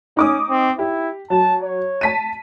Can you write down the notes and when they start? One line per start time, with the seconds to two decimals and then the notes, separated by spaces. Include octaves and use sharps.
0.17 C#4 D#4 D6 D#6
0.50 C4
0.79 E4 G4
1.30 F#3 A5
1.63 C#5
2.01 A5 B6 D#7